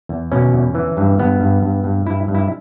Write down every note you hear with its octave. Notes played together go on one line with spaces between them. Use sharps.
E2
B2 C#4
E2
E3
G2
G2 B3
G2
G2
G2
G2 E4
G2
E4